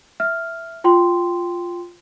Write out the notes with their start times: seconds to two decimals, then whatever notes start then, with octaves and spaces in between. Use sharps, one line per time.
0.20 E5 F6
0.84 F4 G5 C6